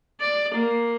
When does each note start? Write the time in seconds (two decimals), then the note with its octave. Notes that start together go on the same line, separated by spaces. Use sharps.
0.21 D5
0.55 A#3